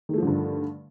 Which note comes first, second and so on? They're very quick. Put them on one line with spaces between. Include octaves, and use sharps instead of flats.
D#3 A3 F3 D3 G2